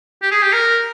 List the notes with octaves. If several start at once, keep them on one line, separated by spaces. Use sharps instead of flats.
G4
G#4
G4
A#4